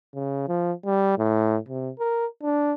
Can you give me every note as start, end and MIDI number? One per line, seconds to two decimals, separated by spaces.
0.14 0.47 49
0.48 0.72 53
0.85 1.14 55
1.18 1.57 45
1.68 1.90 48
1.99 2.26 70
2.43 2.74 62